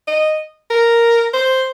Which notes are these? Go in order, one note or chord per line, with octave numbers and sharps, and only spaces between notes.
D#5
A#4
C5